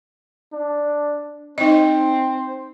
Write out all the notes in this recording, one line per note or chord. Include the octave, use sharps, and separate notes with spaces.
D4
C4 D#4 C5 D#5